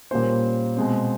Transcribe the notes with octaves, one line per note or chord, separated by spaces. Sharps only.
A#2 G3 A#3 C#4 C5
B2 G#3 C4